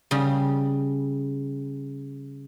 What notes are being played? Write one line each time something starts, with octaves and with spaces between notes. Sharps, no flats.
C#3 G3